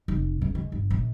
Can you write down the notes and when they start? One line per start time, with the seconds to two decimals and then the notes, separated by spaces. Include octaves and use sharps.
0.08 F1
0.42 C#2
0.55 G#3
0.72 G1
0.90 A#1